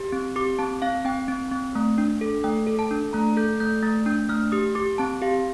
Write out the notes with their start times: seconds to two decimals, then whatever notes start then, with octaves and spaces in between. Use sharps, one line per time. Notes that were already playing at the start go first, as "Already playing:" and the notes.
Already playing: G4
0.12 C4
0.36 G4 D6
0.59 C4 A5
0.82 C4 F5
1.05 C4 G5
1.28 C4
1.51 C4
1.75 A3
1.98 D4
2.21 A4
2.44 A3 G5
2.67 A4
2.79 A5
2.91 D4
3.13 A3 A#5
3.37 A4 G6
3.60 A3 G6
3.82 A3 A6
4.06 D4 G6
4.29 A3 F6
4.52 G4 D#6
4.75 G4 D6
4.98 C4 A5
5.22 G4 F5